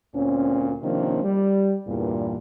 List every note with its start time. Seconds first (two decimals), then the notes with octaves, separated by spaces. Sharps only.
0.15 D2 A#2 C4 C#4
0.82 C3 D#3 F3 A#3 C#4 D4
1.23 G3
1.87 E2 G2 A#2